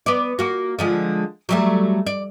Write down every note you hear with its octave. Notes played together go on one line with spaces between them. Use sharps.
B3 D5
A#3 F#4
D3 F3 G#3
F#3 G3 A3
D5